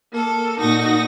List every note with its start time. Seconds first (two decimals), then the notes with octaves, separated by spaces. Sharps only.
0.13 A#3 A4
0.59 A#2 D#4 F#4 A#6